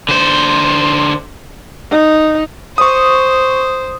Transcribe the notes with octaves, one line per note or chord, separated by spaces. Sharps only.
D3 C5
D#4
C5 C#6 D#6